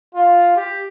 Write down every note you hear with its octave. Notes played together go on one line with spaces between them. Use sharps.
F4
G4